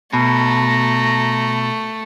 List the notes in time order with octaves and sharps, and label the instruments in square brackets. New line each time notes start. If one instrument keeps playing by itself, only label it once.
[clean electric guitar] B2 [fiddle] A3 [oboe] A#5